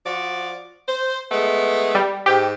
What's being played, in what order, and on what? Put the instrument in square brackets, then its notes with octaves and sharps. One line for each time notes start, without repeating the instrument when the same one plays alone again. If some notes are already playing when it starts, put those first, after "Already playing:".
[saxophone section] F3 F#4 D5
C5
G#3 A3 B3
[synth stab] G3
[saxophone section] G#2 [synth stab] G4